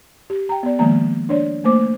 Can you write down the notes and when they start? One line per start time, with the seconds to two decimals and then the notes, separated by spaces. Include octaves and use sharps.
0.30 G4
0.49 G5 A#5
0.63 B3 D5
0.79 D#3 F3 G#3 A#3 A#5
1.29 D4 C#5 D5
1.64 A3 A#3 C5 D6